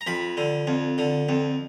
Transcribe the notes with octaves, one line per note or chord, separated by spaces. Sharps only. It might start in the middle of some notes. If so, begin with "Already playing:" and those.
A#5
F2 B5
D3
F2
D3
F2